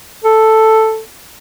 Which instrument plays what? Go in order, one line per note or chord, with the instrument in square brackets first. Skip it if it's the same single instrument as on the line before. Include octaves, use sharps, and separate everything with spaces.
[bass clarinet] A4